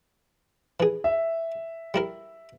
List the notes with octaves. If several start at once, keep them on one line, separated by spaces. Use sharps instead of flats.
E3 G#4
E5
G3 E4 A#4